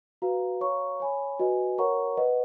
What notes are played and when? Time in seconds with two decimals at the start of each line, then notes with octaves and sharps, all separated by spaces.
0.22 F#4 B4 F5 A#5
0.61 C#5 F5 A#5 C#6
1.00 C#5 G#5 B5
1.39 F#4 B4 D#5 G#5
1.78 A#4 C#5 F#5 A#5 C#6
2.17 B4 D#5 F#5